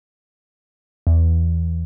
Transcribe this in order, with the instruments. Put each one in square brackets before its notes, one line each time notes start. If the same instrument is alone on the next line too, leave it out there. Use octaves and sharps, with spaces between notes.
[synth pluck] E2